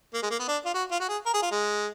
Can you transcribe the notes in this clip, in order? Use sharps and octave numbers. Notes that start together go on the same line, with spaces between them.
A#3
G#3
A#3
B3
D4
F4
F#4
F4
F#4
G#4
A#4
G#4
F4
G#3